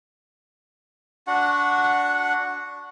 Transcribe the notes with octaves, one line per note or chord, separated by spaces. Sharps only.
D4 F#4 F#5